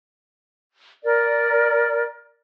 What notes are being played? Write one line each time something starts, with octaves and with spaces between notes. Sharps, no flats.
A#4 D5